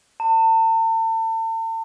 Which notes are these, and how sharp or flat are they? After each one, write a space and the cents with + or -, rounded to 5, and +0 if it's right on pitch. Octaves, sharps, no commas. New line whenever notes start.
A5 +40